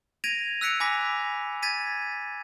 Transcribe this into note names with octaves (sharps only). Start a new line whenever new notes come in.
G#6 A#6 D7 D#7 F7
E6 F#6 B6 C#7 D7 F7
G#5 B5 D6 A#6 B6
G#6 A6 B6 D#7